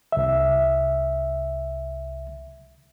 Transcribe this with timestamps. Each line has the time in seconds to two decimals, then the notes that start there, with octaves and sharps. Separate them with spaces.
0.12 C2 E5